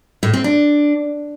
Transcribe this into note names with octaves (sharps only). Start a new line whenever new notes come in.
A2
C4
D4